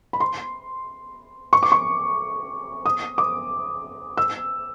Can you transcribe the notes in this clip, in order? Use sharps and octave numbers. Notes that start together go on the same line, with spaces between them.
B5
C6
C#6
D6
C#6
D#6
D6
E6